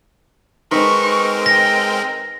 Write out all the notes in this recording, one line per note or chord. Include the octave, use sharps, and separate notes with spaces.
G#3 C4 D#4 A#4 B4 C#6
G5 A#6